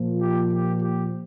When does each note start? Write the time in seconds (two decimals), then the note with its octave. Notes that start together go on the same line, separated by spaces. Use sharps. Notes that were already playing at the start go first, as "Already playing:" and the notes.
Already playing: A#2 F3
0.19 G4
0.50 G4
0.82 G4